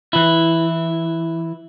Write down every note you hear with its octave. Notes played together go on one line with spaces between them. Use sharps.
E3 E4